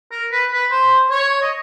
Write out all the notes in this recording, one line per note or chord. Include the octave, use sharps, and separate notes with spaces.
A#4
B4
B4
C5
C#5
D#5